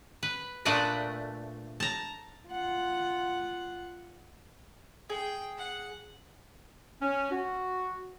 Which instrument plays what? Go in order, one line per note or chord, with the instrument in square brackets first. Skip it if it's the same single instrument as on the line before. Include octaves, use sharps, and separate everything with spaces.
[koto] B4
A#2 A3 D4 B4 D5 D#5
A5 A#5
[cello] F4 F#5
[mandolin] G#4 [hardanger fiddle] G5
[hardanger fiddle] F#5
[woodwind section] C#4
F#4